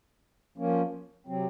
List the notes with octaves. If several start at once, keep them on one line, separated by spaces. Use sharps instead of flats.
F3 A#3 C#4
C3 F#3 C4